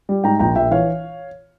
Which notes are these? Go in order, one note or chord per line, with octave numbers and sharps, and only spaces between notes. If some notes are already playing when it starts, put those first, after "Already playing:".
G3
G#2 G5 A#5
A#1 G5 A#5
A#1 E5 G5
E3 C#5 F5